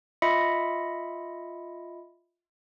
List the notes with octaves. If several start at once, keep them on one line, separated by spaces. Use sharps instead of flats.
F4 D#5 E5 B5 A#6 C#7